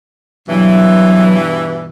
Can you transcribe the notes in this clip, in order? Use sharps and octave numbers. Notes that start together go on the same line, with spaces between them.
G2 B2 E3 F#3